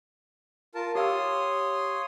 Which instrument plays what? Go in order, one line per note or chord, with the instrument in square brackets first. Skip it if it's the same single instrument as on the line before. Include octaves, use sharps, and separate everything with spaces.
[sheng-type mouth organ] F4 A#4 A5
[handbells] G4 F5 E6 [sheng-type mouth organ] C#5 C6 D#6